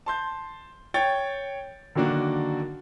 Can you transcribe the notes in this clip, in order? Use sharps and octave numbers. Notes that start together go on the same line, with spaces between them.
A5 C6 G6
C#5 G5 A6
D3 D#3 F#3 A#3 D4 F#4